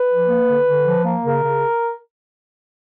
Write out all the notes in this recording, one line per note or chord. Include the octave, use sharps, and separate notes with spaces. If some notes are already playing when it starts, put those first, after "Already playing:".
Already playing: B4
F3
A#3
D3
D3
F3
A#3
C#3 A#4
C#3